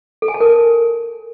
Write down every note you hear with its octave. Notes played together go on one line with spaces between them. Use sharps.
A4
G#5
A5
A#4